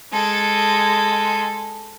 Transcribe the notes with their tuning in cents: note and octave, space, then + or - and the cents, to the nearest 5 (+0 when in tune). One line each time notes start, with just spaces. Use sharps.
G#3 +0 A4 +0